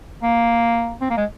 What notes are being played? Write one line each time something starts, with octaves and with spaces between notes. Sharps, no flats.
A#3
C4
A#3
G#3